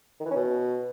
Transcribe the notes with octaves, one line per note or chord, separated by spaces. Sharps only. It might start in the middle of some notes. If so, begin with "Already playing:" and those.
D#3
E3
C#4
B2